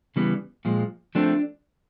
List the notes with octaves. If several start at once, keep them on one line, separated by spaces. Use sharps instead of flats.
C#3 E3 G3 B3
A#2 F3 G#3
F3 A3 C4 D4